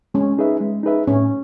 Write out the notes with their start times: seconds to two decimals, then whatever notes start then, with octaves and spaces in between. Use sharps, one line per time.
0.14 G#3 C#4
0.38 D#4 G#4 B4 E5
0.60 G#3
0.83 D#4 G#4 B4 E5
1.07 A2 C#4